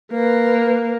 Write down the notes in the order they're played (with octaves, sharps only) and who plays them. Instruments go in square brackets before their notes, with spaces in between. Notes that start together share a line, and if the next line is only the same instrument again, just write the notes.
[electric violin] A#3 [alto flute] B4